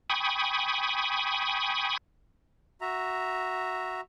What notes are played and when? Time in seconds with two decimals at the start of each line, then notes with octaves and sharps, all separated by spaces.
0.10 G5 G#5 B5 C#6 D#6
2.81 F#4 E5 A#5